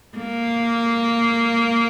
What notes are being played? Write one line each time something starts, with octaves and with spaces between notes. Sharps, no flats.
A#3